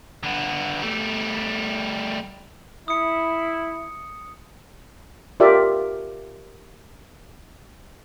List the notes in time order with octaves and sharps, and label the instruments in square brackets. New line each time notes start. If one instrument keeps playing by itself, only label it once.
[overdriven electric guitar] D3 B3
G3 A3
[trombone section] E4 [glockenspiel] D#6 C#7
[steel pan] F4 G4 A#4 D5 E5